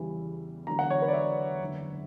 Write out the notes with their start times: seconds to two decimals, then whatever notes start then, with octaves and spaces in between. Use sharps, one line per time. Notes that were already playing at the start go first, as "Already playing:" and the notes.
Already playing: E2 C#3 E3 G3
0.67 E1 E2 D3 F#3 A#5
0.79 F#5
0.90 C#5
1.02 B4
1.08 D5
1.13 E5
1.61 F#1 E2 D3